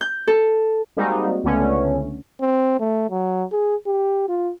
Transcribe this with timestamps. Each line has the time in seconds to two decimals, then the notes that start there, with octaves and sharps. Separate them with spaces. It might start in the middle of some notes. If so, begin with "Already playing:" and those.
0.01 G6
0.27 A4
0.97 G3 G#3 A#3 C4 D#4 F#4
1.44 C#2 D3 A3 B3 C#4
2.41 C4
2.80 A3
3.10 F#3
3.52 G#4
3.86 G4
4.29 F4